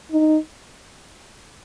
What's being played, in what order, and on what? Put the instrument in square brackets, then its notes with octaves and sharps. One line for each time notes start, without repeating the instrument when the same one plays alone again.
[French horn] D#4